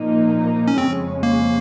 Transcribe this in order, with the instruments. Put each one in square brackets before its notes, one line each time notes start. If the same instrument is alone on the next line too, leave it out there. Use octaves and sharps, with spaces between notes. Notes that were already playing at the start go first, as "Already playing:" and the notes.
Already playing: [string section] A#2 F3 A#3 D#4
[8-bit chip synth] C#4
[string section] F2 C#3 G#3 C#4 [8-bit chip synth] C4
[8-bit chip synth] A#3